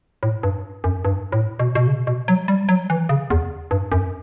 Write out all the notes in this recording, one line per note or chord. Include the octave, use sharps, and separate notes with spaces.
A2
G2
F#2
G2
A2
B2
B2
C#3
B2
F#3
G3
F#3
E3
C#3
E2
G2
F#2